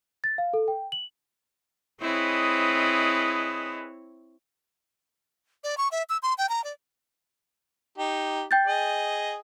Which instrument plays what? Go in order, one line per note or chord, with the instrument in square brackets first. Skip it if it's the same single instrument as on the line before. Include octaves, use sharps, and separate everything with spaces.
[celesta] A6
F5
A4
G5
F#7
[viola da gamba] C4 E4 C#5 [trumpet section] G#4 B4 D#5
[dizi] D5
C#6
E5
E6
C6
G5
A#5
D5
[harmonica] D#4 G4
[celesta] G5 G6 A6
[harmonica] G#4 D#5